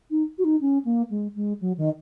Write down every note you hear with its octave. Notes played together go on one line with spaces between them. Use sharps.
D#4
F#4
D#4
C#4
A#3
G#3
G#3
F#3
D#3